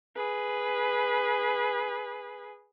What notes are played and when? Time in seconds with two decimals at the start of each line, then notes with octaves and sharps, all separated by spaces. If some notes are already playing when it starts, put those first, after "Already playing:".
0.15 G#4 B4